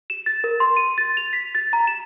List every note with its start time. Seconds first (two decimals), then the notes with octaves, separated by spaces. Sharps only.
0.10 E7
0.26 A6
0.44 A#4
0.60 C6
0.77 D#7
0.98 A6
1.17 F7
1.33 B6
1.55 A6
1.73 A#5
1.87 E7